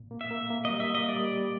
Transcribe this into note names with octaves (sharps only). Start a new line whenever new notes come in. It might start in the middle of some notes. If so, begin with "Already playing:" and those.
Already playing: A#2
A#3
E5
A#3
A#3
G3 D#5
E5
A#3 D#5
G3 D5
G3